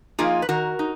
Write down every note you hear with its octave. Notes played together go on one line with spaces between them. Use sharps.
F3 A#3 D#4 F4 G#4
B4
D#3 F#4 A#4
D#4